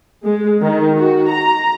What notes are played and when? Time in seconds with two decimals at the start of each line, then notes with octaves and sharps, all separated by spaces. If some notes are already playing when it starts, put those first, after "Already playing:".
0.24 G#3
0.62 D#3
0.98 F#4
1.30 A#5